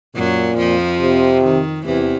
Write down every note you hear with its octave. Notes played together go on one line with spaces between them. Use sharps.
F#2 A#2 F#3
F2 F3
C3
D#3
E2 C3 E3